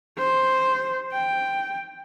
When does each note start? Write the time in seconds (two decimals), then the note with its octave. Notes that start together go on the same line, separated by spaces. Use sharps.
0.18 C5
1.12 G5